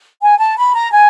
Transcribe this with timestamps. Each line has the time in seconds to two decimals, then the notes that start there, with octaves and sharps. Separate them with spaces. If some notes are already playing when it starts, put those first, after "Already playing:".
0.21 G#5
0.38 A5
0.56 B5
0.74 A#5
0.91 G#5